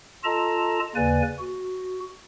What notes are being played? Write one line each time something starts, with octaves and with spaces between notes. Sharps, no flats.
F4 A4 D#5 A5 A#5
D#2 C#3 A#3 B4 D5 G#5
F#4